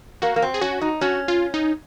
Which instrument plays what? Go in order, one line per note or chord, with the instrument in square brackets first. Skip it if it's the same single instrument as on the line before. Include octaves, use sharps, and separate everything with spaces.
[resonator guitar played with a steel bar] A#3 [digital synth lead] F#4
[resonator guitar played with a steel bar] A#3
C4
[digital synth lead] G#4
[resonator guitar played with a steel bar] C#4 [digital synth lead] F#4
[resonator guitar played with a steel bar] D#4
[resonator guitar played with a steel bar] C#4 [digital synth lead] F#4
[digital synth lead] F4
D#4